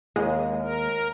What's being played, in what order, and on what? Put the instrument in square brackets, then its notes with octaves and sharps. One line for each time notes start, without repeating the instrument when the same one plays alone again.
[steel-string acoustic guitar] D#2 [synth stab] G#3
[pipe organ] A#4